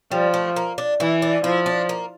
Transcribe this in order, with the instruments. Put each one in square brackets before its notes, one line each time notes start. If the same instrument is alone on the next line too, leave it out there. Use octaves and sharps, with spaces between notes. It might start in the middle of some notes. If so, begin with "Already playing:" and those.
[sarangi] F3 [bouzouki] G3
[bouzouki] A3
A#3
D4
[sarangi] E3 [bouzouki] E4
[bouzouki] D4
[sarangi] F3 [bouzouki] E4
[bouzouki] D4
A#3